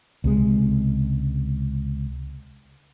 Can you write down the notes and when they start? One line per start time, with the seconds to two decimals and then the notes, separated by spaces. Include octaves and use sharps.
0.24 C#2 C3 G#3